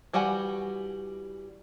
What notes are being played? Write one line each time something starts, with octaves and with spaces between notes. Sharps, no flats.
E3 G3 F#4 F#5 G#5